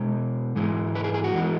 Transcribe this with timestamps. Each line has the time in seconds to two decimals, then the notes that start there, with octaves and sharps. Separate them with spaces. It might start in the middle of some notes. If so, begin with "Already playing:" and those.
Already playing: B2 G#3
0.56 G#2 E3 G#3
0.95 B4
1.04 G#4
1.14 G#4
1.24 F#4
1.33 E2 E3 G#3